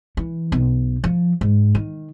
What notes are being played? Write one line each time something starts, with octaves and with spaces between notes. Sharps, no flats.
E3
B1
F3
G#2
D#3